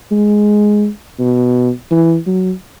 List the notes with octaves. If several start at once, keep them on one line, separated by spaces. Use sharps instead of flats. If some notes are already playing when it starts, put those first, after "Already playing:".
G#3
B2
E3
F#3